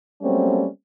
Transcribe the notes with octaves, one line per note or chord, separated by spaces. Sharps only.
F#3 G3 A3 A#3 C4 C#4